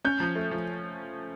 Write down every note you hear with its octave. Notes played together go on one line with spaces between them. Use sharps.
C#4 G6
F3
A3
F3